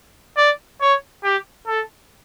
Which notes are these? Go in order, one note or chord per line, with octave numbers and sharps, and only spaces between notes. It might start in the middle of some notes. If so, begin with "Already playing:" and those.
D5
C#5
G4
A4